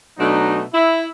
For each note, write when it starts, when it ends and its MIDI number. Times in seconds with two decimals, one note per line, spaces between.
0.19 0.62 47
0.19 0.62 54
0.19 0.62 57
0.19 0.62 62
0.19 0.62 63
0.74 1.07 64